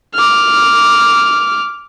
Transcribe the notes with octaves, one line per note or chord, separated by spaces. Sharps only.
D6 F6